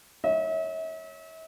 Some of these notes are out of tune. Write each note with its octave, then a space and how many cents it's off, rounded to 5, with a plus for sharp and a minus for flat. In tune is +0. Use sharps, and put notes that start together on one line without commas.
C#5 +0 E5 -40